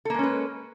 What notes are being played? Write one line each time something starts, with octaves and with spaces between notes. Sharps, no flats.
G#3 A#3 C#4 A4 B4